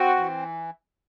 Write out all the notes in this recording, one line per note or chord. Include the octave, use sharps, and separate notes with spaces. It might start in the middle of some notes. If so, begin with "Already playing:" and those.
Already playing: C4 F#4
E3